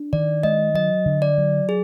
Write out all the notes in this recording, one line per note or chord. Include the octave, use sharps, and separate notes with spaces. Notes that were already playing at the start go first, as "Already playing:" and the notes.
Already playing: D4
D#3 D5
G#3 D#5
F#3 D#5
D3
D5
F#3
G#4